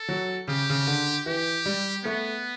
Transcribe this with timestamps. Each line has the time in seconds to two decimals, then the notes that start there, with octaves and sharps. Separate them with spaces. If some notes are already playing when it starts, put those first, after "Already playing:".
Already playing: A4
0.09 F#3
0.48 C#3 G4
0.70 C#3
0.87 D3
1.26 E3 G4
1.66 G3
2.04 A3 B3